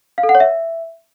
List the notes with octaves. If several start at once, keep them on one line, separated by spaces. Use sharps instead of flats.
F5
A4
F#5
C#5
E5